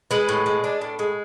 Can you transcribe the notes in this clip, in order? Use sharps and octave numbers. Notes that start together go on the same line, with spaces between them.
G#3 B4
A2
G#3
D4
A2
G#3